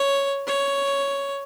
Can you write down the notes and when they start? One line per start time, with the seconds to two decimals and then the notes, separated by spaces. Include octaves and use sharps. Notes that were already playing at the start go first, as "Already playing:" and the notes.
Already playing: C#5
0.47 C#5